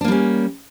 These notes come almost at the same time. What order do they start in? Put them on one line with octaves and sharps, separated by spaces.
D4 A#3 G3 C#4